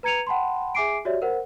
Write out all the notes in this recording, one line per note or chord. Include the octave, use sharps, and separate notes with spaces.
B4 A#5 G#6 C#7 D#7 F7
F#5 G5 A5 B5 C6
G#4 E5 G#5 D6 C7 D7
F#4 G4 C#5 D5 E5
A#4 C5 F#5